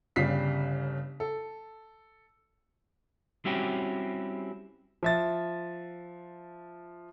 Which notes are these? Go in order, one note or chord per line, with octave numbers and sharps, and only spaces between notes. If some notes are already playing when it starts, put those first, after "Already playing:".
G1 C#3 G3 B6 C7
A4
G3 C4 C#4 E4 F#4 G4
F3 E5 A6